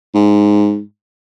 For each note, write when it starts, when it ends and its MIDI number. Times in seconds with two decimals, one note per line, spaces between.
0.14 0.80 44